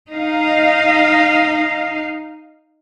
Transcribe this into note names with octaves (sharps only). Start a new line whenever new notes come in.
D#4 F5